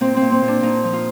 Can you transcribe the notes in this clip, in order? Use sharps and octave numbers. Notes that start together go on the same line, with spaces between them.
A#2 C4
C4
A#2
C4
A#2
D4
A#2 D#4
F3
F4